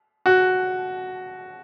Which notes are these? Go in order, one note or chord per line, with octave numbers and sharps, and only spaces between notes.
F#4